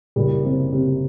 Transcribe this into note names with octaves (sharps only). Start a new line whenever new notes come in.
F#1 G3
C3
C3